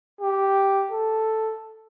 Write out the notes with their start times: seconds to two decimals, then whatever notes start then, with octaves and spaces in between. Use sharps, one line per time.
0.21 G4
0.91 A4